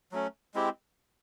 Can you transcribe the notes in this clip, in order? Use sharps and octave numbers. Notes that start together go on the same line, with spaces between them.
F#3 A3 C#4
G#3 C4 E4 G4